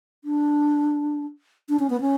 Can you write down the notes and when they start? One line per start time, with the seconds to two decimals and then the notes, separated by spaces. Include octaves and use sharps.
0.24 D4
1.69 D4
1.79 C#4
1.90 B3
2.01 C#4